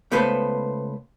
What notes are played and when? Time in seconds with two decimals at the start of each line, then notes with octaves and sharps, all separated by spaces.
0.11 C#2 A3 B3 B4 C5